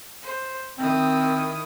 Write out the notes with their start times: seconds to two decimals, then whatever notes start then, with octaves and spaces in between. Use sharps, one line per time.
0.23 C5
0.78 D#3 C4 E4 D#6